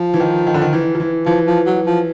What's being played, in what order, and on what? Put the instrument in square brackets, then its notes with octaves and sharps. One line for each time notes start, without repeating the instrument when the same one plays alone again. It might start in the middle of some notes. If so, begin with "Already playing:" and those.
Already playing: [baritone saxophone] F3
[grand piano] E3
D#3
D#3
D3
D#3
E3
F3
E3
[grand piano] E3 [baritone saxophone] F3
[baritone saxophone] F3
F#3
F3